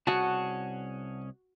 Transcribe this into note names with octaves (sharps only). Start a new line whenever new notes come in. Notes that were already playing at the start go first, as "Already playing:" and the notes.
C2 C#4 F#4 G#4 F#5 A5